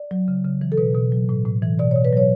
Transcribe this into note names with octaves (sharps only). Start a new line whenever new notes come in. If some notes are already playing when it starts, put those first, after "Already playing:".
Already playing: D5
F#3
C#3
C#3
E3
A4
B2 B4
B2
F#3
A2
A2
E3
B2 D5
C#5
B2
B4
F#3 C#5